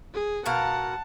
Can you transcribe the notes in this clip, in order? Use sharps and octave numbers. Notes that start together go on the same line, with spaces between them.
G#4
B2 A#4 F5 F#5 A5